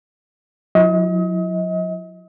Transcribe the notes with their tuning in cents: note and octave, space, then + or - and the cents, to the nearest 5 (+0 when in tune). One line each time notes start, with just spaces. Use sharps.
F#3 -40 E4 +0 D#5 +35